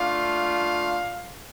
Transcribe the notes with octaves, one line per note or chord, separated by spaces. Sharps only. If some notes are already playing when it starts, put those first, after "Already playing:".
Already playing: A3 D4 F4 F5